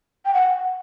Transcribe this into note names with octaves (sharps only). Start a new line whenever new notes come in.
G5
F#5